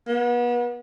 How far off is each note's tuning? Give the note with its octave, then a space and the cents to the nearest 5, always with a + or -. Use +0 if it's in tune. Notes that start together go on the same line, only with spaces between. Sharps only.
B3 -35